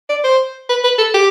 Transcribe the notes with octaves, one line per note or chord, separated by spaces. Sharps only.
D5
C5
B4
B4
A4
G4